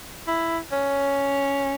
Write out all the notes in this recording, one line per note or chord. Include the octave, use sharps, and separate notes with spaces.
E4
C#4